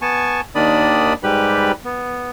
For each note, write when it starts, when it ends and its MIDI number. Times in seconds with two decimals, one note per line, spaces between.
0.02 0.41 59
0.02 0.41 80
0.02 0.41 81
0.02 0.41 85
0.55 1.13 39
0.55 1.13 51
0.55 1.13 62
0.55 1.13 74
0.55 1.13 83
0.55 1.13 87
1.23 1.72 44
1.23 1.72 55
1.23 1.72 67
1.23 1.72 71
1.23 1.72 83
1.85 2.31 59